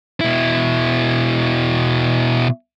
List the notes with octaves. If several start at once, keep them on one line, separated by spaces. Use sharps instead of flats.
B2 E4